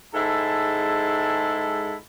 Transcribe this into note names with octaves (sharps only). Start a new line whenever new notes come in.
G#2 G#3 E4 A4 A5